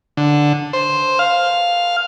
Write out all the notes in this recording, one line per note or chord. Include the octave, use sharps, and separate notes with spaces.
D3
C5
F5